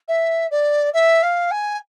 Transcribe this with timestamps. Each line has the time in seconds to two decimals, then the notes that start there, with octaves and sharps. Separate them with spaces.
0.08 E5
0.51 D5
0.94 E5
1.23 F5
1.51 G#5